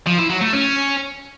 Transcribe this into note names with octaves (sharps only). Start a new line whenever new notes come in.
F3
E4
F#3
A3
C#4